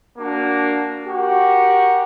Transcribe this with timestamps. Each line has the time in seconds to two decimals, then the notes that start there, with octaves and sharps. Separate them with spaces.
0.18 A#3 D4 F#4
1.06 F#4 G4 A#4